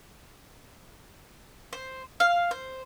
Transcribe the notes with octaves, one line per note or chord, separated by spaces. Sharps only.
C5
F5
C5